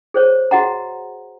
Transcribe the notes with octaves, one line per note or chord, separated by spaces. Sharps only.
G#4 C5 C#5
F#4 G#4 D#5 F#5 A#5